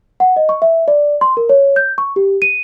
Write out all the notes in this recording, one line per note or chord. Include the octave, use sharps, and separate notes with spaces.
F#5
D#5
C#6
E5
D5
C6
A#4
C#5
G6
C#6
G4
D#7